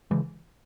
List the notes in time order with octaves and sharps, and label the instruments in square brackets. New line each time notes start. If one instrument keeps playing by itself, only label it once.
[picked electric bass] C#3 E3 G#3